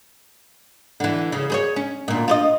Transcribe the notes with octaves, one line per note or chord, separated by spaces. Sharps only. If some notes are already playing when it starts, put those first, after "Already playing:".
D3 E3
C#3
G#4 C5 C#5
C#4
D2 A#2
F4 C5 D#5